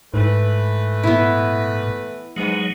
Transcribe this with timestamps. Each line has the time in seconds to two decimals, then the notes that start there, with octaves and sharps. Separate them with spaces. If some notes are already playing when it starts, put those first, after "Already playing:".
0.14 G#2 E3 A3 B4
1.04 A#2 B3 E4
2.36 G#2 F#3 G#3 B3